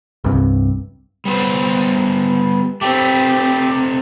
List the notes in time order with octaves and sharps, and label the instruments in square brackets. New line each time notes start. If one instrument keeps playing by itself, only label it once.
[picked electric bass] C2 G2 C3
[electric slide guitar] G3 B3 C5
[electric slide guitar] A3 C4 [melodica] G4 D6